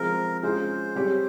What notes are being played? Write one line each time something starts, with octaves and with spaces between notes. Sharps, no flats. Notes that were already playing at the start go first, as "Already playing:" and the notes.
Already playing: F3 G#3 C4 A#4
G#3 C#4 F4 G#4 C5
G3 C4 G4 C#5